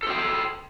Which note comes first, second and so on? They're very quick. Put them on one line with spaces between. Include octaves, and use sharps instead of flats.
A4 C5 G5